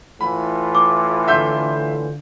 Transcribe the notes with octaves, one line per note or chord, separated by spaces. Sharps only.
A2 E3 F4 B5
D6
D3 E5 C6 G6